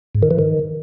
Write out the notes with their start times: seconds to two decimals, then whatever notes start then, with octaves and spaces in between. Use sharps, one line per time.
0.15 G#2
0.23 D#3
0.31 E3
0.39 D#3